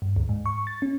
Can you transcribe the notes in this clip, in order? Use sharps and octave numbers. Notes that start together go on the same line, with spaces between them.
G2
D2
G#2
C#6
A6
C#4